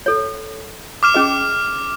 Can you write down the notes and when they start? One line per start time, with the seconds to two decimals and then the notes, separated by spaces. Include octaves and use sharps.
0.06 A4 C#5
1.03 D6 F6 E7
1.14 C#4 G#4 D#5